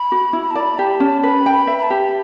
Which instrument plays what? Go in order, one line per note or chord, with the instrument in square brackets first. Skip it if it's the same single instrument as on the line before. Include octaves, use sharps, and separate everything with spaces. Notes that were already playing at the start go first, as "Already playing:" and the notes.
Already playing: [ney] B5
[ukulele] F#4
E4
[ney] B5
A5
[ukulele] D5 [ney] B5
[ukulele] G4 [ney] A5
[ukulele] C#4
[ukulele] B4 [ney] B5
[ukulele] G5
[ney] B5
[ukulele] E5
[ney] B5
A5
[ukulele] G4